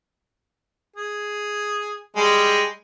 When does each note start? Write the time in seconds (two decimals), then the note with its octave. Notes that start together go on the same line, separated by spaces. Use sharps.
0.96 G#4
2.17 G3 G#3